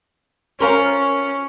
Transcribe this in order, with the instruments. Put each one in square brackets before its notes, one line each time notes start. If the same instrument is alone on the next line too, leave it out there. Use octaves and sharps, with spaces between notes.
[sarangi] C#4 [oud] F4 A#4 C5